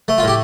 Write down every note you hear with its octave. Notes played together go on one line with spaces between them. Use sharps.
A3
F4
A2 G4